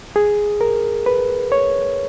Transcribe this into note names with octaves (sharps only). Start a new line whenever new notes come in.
G#4
A#4
B4
C#5